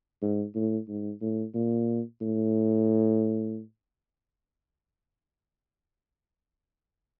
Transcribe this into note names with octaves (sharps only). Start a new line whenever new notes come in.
G#2
A2
G#2
A2
A#2
A2